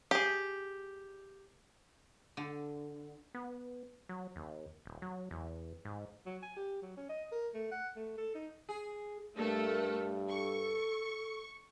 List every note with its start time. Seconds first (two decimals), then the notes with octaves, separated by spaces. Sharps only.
0.11 G4 G#4
2.37 D3
3.34 B3
4.09 F#3
4.36 D#2
4.86 D#1
5.02 F#3
5.31 E2
5.85 G#2
6.26 F#3
6.42 G#5
6.57 G4
6.82 F#3
6.97 C#4
7.09 D#5
7.32 A#4
7.54 A3
7.71 F#5
7.96 A3
8.18 A4
8.35 D#4
8.69 G#4
9.37 G2 A3 A4 A#4
10.29 A4 C#6